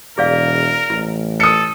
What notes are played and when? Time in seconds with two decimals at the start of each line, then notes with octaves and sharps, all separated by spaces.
0.18 E1 G#4 A#4 D5 F5
0.90 A1 E4
1.40 A4 D#6 C#7